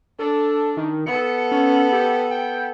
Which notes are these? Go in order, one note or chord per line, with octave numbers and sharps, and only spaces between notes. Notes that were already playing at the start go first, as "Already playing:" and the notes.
D4 A4
D#3
B3 A4 C#7
C#4
G4
G5